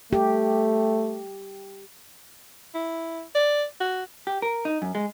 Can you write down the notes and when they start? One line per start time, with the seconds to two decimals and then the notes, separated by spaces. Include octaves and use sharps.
0.13 A3 G4
2.75 E4
3.35 D5
3.81 F#4
4.27 G4
4.42 A#4
4.65 D#4
4.82 F#2
4.95 G#3